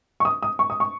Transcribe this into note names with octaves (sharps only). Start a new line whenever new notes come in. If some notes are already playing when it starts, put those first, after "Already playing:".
C#6
D#6
D#6
C#6
D#6
C#6